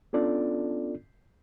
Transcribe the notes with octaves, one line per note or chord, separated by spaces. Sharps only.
B3 C#4 D4 F4 A4 D5